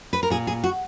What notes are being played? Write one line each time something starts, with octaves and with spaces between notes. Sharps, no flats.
B4
A#4
A#2 G#4
G#4
F#4